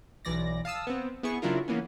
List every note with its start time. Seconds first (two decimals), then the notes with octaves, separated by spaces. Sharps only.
0.25 B1 E3 D5 A#6
0.65 F5 A5 D#6 E6
0.87 B3 C4
1.23 B3 E4 G#4 C#6
1.42 C#3 F#3 D4 E4 F4 A#4
1.68 E3 A#3 B3 C#4